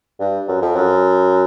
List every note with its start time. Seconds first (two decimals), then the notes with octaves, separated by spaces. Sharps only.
0.20 G2
0.48 F#2
0.62 F2
0.76 F#2